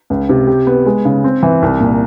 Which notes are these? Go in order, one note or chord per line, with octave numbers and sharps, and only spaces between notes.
C#2
C3
G4
B3
G#3
C#3
C4
E3
C2
A#2